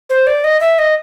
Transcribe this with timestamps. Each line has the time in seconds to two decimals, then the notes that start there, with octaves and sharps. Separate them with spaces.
0.10 C5
0.27 D5
0.44 D#5
0.60 E5
0.79 D#5